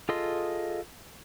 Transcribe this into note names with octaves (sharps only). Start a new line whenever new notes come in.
F4 G#4 A4 D#5 C6